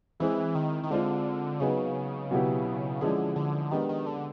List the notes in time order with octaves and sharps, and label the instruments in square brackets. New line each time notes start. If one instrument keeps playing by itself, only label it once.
[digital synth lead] E3 [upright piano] G#3 C4 E4 G#4
[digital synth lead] D#3
D#3
[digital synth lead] D3 [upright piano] G#3 C4 F4
[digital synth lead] C#3 [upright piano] F#3 B3 D#4 G#4
[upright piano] B2 F#3 B3 E4 G4
[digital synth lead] D3 [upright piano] F3 G#3 C#4 E4 G#4
[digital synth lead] D3
[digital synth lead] D#3 [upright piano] G#3 B3 D4 G4
[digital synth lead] D#3
D3